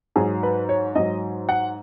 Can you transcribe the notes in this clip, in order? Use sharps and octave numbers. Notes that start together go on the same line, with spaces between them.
G#2 F#3 G#4
B4
C#5
G#2 F#3 D#5
F#5